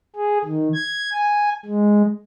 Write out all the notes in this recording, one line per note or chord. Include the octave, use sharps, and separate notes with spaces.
G#4
D#3
G#6
G#5
G#3